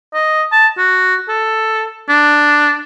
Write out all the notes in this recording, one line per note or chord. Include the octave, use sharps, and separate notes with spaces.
D#5
A5
F#4
A4
D4